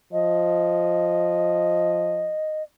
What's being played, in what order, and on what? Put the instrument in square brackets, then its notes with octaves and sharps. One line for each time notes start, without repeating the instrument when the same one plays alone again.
[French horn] F3 [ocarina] D#5